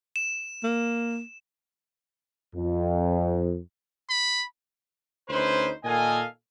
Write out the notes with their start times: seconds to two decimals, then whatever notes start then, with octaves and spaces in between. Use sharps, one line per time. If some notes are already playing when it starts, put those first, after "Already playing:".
0.16 E7
0.63 A#3
2.54 F2
4.10 B5
5.29 D2 C#4 D#4 B4 C5
5.85 A#2 D#3 A4 D#5 F5 G#5